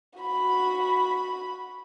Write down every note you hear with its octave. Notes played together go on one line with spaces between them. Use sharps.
F#4 B5